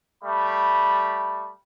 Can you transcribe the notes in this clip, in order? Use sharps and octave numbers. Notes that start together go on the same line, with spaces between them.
G3 A3 B5